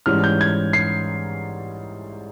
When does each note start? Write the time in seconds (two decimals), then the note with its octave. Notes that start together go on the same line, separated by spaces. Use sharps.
0.06 G#2 E3 G3 C#4 F6
0.24 G6
0.41 G#6
0.73 C7